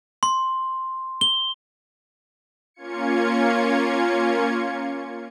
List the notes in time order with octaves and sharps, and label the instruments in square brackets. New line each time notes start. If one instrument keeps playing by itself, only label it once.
[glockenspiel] C6
G7
[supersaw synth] A#3 C#4 F4 G#6 C#7